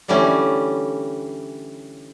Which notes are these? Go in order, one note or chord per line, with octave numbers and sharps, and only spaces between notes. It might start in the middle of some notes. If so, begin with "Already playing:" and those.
D3 E3 G3 A3 C#4